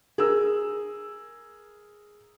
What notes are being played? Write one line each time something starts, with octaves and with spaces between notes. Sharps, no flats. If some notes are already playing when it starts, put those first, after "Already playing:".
G#4 A#4 E6